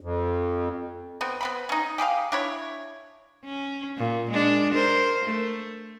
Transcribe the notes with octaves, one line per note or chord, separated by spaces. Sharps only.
F2
B3 C4
B3 C4 B5
C#4 D#4
G4 G#4 B4 F5
D4 E4 C#5
C#4
A#2
G#3 D4
A#4 C5
A3